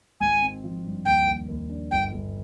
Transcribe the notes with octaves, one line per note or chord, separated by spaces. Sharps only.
G#1 G#5
C4
F3
G2
D#2 G5
D#2
D#2
D4
G1 G5
G1